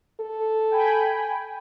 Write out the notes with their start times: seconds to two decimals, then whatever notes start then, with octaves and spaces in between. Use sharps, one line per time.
0.20 A4
0.71 G5 G#5 B5